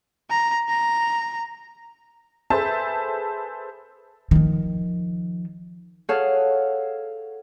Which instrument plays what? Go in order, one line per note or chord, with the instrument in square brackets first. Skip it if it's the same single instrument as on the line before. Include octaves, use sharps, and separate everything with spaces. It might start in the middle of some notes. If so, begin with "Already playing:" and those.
[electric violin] A#5
A#5
[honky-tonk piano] G#4 A4 B4 C5 E5 A5
[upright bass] D#3 F3
[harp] G#4 A4 C#5 F5 F#5